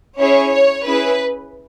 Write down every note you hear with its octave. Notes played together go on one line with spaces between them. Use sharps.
C#4 E4 G#4 C#5
C#5
C#4 E4 G#4 B4